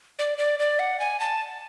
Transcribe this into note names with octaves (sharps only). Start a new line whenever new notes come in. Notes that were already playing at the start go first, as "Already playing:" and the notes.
D5
D5
D5
F#5
G#5
A5